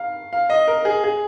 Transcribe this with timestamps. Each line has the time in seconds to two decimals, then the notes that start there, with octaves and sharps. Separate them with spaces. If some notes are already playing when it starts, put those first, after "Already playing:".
Already playing: F5
0.33 F5
0.50 D#5
0.68 A#4
0.85 G#4
1.04 G#4